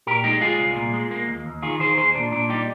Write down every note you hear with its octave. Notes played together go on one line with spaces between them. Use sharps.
A#2 G4 A#4
G#3 D#4 G4
G#3 F4 G#4
C2
A#2
G#3
A#3
D#2
D#2
D#3 F4 G#4
D#3 G#4 C5
D#2 G#4 C5
A#2 D4
A#2 D4
G3 D#4 G4